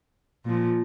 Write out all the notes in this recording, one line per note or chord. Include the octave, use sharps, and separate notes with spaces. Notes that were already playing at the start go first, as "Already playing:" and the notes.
A#2 F3